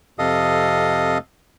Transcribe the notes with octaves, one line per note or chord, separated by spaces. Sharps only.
F2 C3 A4 D#5 F5 D#6